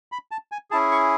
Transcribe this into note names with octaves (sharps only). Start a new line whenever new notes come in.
B5
A5
G#5
C#4 E4 G#4 A5
C#6